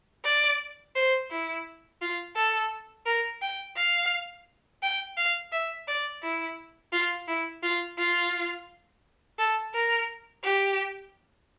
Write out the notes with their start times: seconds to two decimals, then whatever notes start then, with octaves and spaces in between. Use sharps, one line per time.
0.25 D5
0.96 C5
1.31 E4
2.02 F4
2.36 A4
3.06 A#4
3.42 G5
3.76 F5
4.82 G5
5.17 F5
5.52 E5
5.88 D5
6.23 E4
6.93 F4
7.28 E4
7.63 F4
7.98 F4
9.39 A4
9.74 A#4
10.44 G4